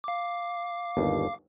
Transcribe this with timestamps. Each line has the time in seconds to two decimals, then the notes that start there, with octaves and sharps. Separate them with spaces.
0.04 F5 D6
0.97 G1 D#2